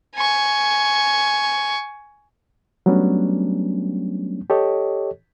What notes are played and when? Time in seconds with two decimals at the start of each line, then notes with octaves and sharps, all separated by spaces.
0.16 G#5 C#6
2.86 F#3 G3 A3 B3 C#4 D4
4.50 G4 A4 C#5 D#5